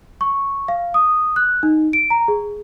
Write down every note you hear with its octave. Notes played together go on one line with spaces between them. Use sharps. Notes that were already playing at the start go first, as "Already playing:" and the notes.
C#6
F5
D#6
F#6
D#4
D7
A#5
G#4